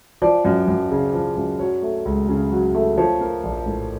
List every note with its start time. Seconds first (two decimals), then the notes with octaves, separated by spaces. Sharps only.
0.22 F3 D5
0.45 F#2
0.68 F#2
0.91 C#3
1.14 F3
1.37 F#2
1.59 F#3 C#5
1.82 A3
2.05 C#2
2.29 C#3
2.52 F#3
2.75 A3
2.97 F3 C#5
3.21 A#3
3.43 A#1
3.66 A2